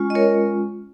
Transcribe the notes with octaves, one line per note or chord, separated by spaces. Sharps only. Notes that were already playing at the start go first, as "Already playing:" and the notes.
Already playing: G#3 C#4 F4
D#5
A#4 C#5